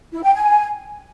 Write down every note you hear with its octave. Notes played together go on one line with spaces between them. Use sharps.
E4
G5
G#5